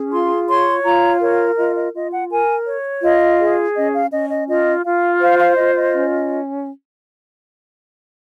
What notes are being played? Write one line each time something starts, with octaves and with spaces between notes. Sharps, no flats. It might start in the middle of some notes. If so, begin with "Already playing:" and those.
Already playing: C#4 G#4
F4 C6
C#5 C6
F4 A#5
A#4 C#5
F4 D#5
D#5
F4 D#5
F#5
A#4 G#5
C#5
F4 D#5
G#4
C#4 D#5
F5
C#4 D#5
D#5
F4 D#5
F4 F5
C5 F5
F5
F4 D#5
D#5
C#4